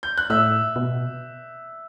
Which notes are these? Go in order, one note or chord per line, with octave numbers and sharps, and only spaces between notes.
G6
F#6
A2 E5 E6
B2